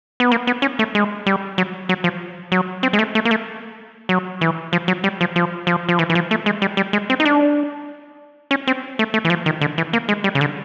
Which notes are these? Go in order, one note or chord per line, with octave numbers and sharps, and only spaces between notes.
B3
A#3
B3
C#4
A3
G#3
G3
F#3
F#3
F3
F#3
C4
G#3
A3
A3
A#3
A3
F#3
E3
F3
F#3
G3
F3
F3
F3
F3
E3
E3
F3
A3
G#3
G3
G3
G#3
C4
D#4
D4
C#4
C4
A3
A3
E3
F3
D#3
D3
E3
A#3
G#3
G3
C#3
D3